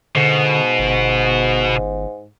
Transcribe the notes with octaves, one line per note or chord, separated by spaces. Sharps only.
G#2 B2 D3
G1